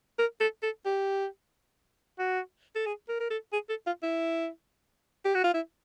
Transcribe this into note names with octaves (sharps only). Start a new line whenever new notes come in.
A#4
A4
A4
G4
F#4
A4
G#4
A#4
A#4
A4
G#4
A4
F4
E4
G4
F#4
F4
E4